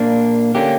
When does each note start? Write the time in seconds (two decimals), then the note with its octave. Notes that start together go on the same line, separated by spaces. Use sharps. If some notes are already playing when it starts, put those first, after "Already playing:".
Already playing: A#2 A#3 D4
0.55 D3 A#3 C#4 G4